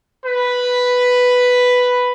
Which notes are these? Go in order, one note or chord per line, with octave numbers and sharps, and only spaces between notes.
B4